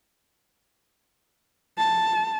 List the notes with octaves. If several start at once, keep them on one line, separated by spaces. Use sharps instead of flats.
A5